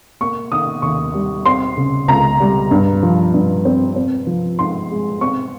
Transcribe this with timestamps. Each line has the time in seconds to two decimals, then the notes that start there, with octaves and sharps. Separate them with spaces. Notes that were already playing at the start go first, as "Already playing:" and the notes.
0.21 A#3 C#6
0.51 D#3 D#6
0.82 D#2 C#6
1.14 G3
1.46 C4 C6
1.77 C#3
2.08 C#2 A#5
2.40 G3
2.71 G2
3.03 F3
3.34 G2
3.65 C4
3.96 C4
4.27 F3
4.59 G#2 C6
4.90 G#3
5.21 C4 C#6